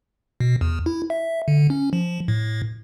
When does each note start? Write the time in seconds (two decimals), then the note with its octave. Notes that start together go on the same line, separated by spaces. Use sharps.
0.40 B2
0.61 E2
0.86 E4
1.10 E5
1.48 D3
1.70 C#4
1.93 F3
2.28 A2